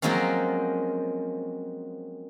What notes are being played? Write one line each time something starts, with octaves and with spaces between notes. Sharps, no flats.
F3 F#3 G#3 A#3 C4 C#4